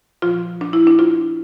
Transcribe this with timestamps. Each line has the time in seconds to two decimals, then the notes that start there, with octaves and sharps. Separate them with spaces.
0.22 A#2 F3 F4
0.61 D4
0.73 E4
0.87 D4
0.99 F4